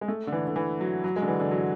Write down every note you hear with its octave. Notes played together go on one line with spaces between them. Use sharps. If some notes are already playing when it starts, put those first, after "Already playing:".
G#3
A3
D3
E3
D3
E3
F#3
F#3
G#3
D3
E3
D3
F#3